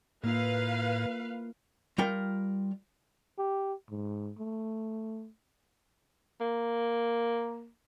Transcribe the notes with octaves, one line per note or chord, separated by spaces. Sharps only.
A2 A#3 E4 F4 B4 F5
G3 F4 A#4 G5
G4
G#2
A3
A#3